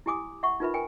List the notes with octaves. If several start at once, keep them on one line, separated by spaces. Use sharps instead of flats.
E4 G4 G#5 D6 D#6
E5 F#5 C#6
D#4 F4 A#4 B4 E5 B5
A#4 G5 G#5